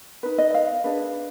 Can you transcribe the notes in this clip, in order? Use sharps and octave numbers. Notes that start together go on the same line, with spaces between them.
D#4 B4
D#5
F5
D4 G#4 B4